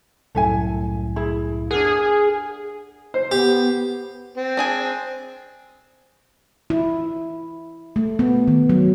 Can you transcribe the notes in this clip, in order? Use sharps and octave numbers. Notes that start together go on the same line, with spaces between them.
C2 F#2 A2 A4 E5 G#5
E4 G#4 B5
D4 G#4 A#4 F#5 F6
C5
B3 G4
C4
D4 G#4 G#5
E4
A3
B3
D#3
F#3